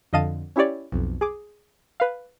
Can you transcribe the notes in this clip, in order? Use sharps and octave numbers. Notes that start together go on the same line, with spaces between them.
F2 D3 D#5 F5 A5 D#7
C#4 E4 G4 C#5 D5
B1 F2
G#4 D6
B4 F5